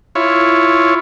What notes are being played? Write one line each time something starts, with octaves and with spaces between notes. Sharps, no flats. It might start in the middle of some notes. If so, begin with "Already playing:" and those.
E4 F4 C#5